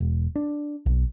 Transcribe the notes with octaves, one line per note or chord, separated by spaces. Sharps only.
E1
D4
B1